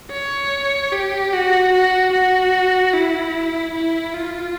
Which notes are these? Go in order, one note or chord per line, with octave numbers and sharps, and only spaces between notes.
C#5
G4
F#4
F#4
F#4
E4
E4
F4